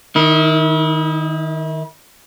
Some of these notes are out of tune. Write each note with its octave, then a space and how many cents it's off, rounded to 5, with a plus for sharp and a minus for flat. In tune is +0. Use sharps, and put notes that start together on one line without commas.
D#3 +0 E4 -35